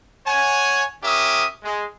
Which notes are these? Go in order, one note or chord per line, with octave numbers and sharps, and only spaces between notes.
C#5 F#5 G#5
C#4 G4 A#4 E5 D#6
G#3